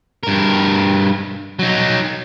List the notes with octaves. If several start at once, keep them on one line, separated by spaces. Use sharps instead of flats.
G2 A#4
F#3 D#4